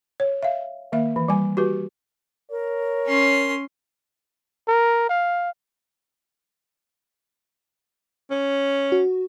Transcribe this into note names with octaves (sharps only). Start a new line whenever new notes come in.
C#5
E5 F5
D#3 A#3 E5
E3
G3 G#5
F#4 G4 B4
A#4 C#5
C#4 C6
A#4
F5
C#4
F#4